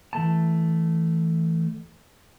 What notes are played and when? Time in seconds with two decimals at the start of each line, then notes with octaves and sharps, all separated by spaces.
0.13 E3 A3 A5